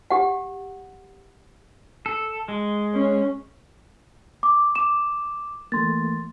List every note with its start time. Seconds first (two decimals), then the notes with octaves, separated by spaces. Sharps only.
0.10 G4 F#5
2.06 A4
2.48 G#3
2.94 C#4
4.43 D6
4.75 D6 E7
5.72 E3 A3 A#3 C6 A6